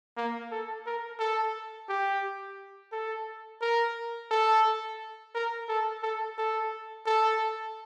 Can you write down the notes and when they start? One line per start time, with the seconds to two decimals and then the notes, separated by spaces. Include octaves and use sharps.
0.17 A#3
0.51 A4
0.86 A#4
1.19 A4
1.89 G4
2.92 A4
3.61 A#4
4.31 A4
5.35 A#4
5.68 A4
6.03 A4
6.38 A4
7.06 A4